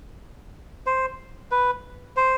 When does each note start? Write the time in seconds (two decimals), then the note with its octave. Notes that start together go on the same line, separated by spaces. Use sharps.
0.86 C5
1.51 B4
2.17 C5